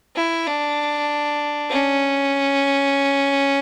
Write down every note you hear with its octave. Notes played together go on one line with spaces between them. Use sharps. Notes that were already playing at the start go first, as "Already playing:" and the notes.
E4
D4
C#4